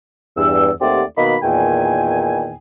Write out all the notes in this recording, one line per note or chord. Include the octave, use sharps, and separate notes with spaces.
E2 G2 E6
D#2 A3 C4 G4 D5 F#5
B2 D#3 A#3 D#5 B5
E2 A#2 D#3 G5 G#5